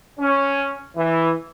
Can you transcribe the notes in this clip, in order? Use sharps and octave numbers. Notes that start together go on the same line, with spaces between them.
C#4
E3